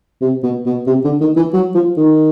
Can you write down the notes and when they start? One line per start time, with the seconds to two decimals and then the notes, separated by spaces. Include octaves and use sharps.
0.21 C3
0.43 B2
0.66 B2
0.87 C3
1.04 D3
1.21 D#3
1.36 E3
1.53 F#3
1.75 F3
1.97 D#3